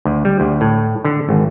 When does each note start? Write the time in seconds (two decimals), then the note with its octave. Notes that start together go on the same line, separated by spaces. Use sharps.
0.05 D2
0.25 G3
0.40 D2
0.61 A2
1.04 D3
1.29 G#1